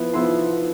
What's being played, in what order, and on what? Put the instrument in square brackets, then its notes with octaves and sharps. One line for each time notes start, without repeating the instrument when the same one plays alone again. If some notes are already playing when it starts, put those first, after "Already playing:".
Already playing: [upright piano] F3 B3 E4
F3 B3 E4 C6 E6